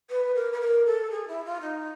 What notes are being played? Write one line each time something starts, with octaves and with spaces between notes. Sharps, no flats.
B4
A#4
B4
A#4
A4
G#4
E4
F4
D#4